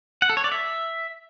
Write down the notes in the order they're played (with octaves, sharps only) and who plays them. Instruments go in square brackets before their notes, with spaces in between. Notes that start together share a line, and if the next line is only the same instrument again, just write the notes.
[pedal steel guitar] F#5
A4
C#5
D5
E5